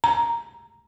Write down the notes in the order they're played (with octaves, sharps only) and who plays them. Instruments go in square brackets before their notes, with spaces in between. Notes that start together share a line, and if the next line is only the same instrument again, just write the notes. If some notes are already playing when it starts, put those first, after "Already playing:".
[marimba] A#5